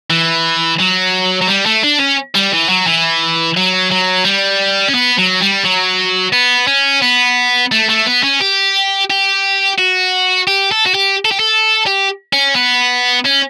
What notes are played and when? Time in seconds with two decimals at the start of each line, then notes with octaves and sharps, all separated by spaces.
0.10 E3
0.80 F#3
1.42 F#3
1.48 G3
1.66 A3
1.84 D4
2.00 C#4
2.35 G3
2.53 E3
2.69 F#3
2.87 E3
3.57 F#3
3.91 F#3
4.25 G3
4.88 C#4
4.94 B3
5.18 F#3
5.41 G3
5.64 F#3
6.33 B3
6.67 C#4
7.02 B3
7.72 A3
7.89 A3
8.06 B3
8.23 C#4
8.41 G4
9.10 G4
9.78 F#4
10.47 G4
10.71 A4
10.86 F#4
10.94 G4
11.25 A4
11.31 G4
11.39 A4
11.87 G4
12.33 C#4
12.55 B3
13.25 C#4